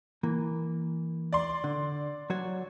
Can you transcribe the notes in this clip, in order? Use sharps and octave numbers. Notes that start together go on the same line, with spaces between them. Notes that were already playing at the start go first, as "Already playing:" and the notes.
E3 A#3
D5 C6
D3
F#3 F#4 C#5